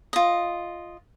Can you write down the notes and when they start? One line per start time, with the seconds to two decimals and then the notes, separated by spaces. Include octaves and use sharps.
0.13 F4 D#5